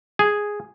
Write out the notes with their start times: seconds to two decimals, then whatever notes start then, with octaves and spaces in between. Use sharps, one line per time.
0.19 G#4